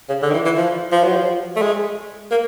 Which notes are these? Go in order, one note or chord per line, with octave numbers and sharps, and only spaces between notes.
C#3
D3
D#3
E3
E3
F3
F3
F#3
F3
A3
G#3
A#3